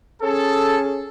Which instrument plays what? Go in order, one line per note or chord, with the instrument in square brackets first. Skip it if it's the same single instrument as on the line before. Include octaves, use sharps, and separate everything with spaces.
[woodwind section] C#4 G#4 [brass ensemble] A4